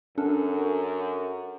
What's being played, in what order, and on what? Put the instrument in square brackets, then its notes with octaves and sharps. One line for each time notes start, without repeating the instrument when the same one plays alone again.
[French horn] F#2 [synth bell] C#4 D4 A4